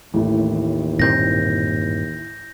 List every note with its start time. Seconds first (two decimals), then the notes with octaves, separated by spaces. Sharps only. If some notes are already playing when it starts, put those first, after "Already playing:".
0.14 A1 D#2 A2
0.99 G2 A#2 C4 G6 A#6